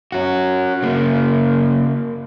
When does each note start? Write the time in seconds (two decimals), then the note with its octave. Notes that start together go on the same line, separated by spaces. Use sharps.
0.12 C#4 F#4
0.82 C#3 A#3